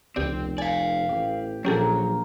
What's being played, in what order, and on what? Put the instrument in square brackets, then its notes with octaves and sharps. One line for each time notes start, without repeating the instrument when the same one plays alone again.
[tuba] F1 [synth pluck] C#2 G4 D5 [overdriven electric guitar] C4
[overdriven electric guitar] D5 F5 [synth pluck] G#5
[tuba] A1 [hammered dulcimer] G4
[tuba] A#1 [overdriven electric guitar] F#3 [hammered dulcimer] A#3 A#4 [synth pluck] C#4 G4 A4